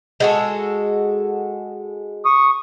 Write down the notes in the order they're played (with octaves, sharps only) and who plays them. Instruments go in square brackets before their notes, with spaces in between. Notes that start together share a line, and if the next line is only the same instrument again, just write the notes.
[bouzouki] G#3 F#4 A4
[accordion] C#6 D#6